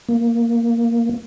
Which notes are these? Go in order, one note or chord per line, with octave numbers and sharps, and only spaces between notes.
A#3